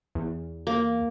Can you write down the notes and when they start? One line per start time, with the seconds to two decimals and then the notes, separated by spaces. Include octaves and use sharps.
0.15 E2
0.67 A#3